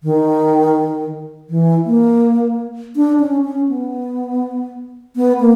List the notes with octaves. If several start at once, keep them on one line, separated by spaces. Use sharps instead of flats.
D#3
E3
A#3
D4
C#4
C#4
B3
B3
A#3